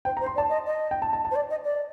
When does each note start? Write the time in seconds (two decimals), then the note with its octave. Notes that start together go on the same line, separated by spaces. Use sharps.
0.05 C5 G5
0.17 A#5
0.20 C5
0.26 C6
0.35 D5
0.38 A5
0.49 D#5
0.65 D#5
0.91 G5
1.02 A5
1.13 A5
1.25 A5
1.31 C5
1.35 D5
1.50 D#5
1.64 D5